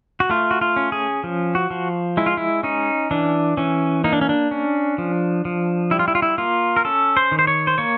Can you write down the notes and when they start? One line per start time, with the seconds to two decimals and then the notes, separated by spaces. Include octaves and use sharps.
0.20 F#4
0.30 A3 F4
0.51 F#4
0.61 F4
0.76 C#4
0.92 G#4
1.24 F3
1.55 F#4
1.71 F3
2.17 G#3 E4
2.26 F4
2.37 E4
2.63 C#4 D#4
3.11 E3 D4
3.57 E3 C#4
4.04 A#3 D#4
4.13 D4
4.21 C#4
4.29 D4
4.51 C#4
4.98 F3
5.45 F3
5.91 G3 E4
5.99 F4
6.08 E4
6.15 F4
6.22 E4
6.38 A#3 F4
6.76 A#4
6.85 C#4 A4
7.17 C5
7.32 D#3
7.39 C5
7.47 C#5
7.67 C5
7.78 A#3 C#5